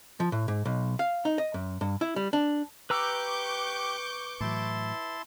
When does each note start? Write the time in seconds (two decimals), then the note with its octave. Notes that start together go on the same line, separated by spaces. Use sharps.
0.20 F3
0.32 A2
0.48 G#2
0.65 B1
0.99 F5
1.25 D#4
1.38 D#5
1.54 F#2
1.81 G2
2.01 E4
2.16 G3
2.33 D4
2.90 G4 B4 A#5 C#6 D6 E6 G6
4.41 A2 E3 F#3 E4 A5 C6